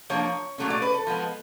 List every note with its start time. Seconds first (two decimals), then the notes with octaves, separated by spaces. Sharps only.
0.10 F3 A#3 D4 C#5
0.58 A#2 F#3 A3 C#4
0.70 D5
0.82 B4
0.94 A4
1.07 F3 G#3 B3